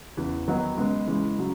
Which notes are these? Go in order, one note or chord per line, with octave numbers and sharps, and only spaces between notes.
E2 C#3 E3
D#3 F#3 B3 D#4 F#4
C#3 G#3 B3
C#3 E3 G#3
C#3 F#3